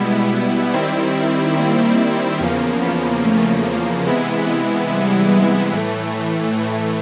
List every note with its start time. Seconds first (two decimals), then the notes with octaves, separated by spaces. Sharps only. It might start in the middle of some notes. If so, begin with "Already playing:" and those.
Already playing: B2 G3 G#3 B3 E4
0.73 D#3 G3 C4 E4
1.57 A#3
2.40 E2 C#3 F3 A#3 B3
2.82 B3
3.23 A3
4.06 C3 E3 G#3 B3 E4
4.90 G3
5.73 A2 E3 A3